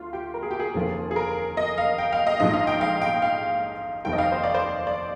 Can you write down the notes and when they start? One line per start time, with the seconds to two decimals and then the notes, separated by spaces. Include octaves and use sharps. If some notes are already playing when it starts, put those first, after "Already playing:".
Already playing: D2 F4
0.13 G4
0.34 A#4
0.43 G#4
0.51 G4
0.59 G#4
0.74 F1 D#2 D3 F3 A#3
1.11 G#4
1.16 A#4
1.57 D#5
1.78 F5
1.98 G5
2.13 F5
2.27 D#5
2.40 A#1 G#2 F3 G#3 D#5
2.53 F5
2.67 G5
2.81 F5
3.02 G5
3.22 F5
4.05 F1 D#2 D#3 G3 G5
4.13 D#5
4.18 F5
4.32 C5
4.44 D5
4.54 C5
4.87 D5